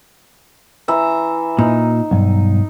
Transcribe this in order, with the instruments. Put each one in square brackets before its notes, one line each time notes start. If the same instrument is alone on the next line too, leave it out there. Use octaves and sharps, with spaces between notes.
[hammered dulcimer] E3 E5 A#5
[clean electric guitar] A#2 [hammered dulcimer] D#4
[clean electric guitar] B1 G2